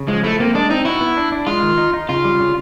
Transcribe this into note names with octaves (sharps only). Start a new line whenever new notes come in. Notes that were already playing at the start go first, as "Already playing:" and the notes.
Already playing: C#3
F3 G#3
A3 E4
A#3 C4
G#3 D4
C4 D#4
E4 F#4
B3
D4
D4
G#3 F4
D#3
D#4
D#4
C#3 F4
G3
C#3